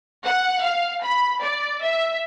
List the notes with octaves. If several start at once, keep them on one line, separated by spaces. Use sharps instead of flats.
F#5
F5
B5
D5
E5